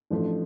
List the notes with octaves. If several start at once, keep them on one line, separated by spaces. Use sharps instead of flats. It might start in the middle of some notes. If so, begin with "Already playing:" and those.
A1 A2 F3 A3 D4